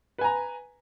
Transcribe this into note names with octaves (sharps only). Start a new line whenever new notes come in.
B4 G#5 A#5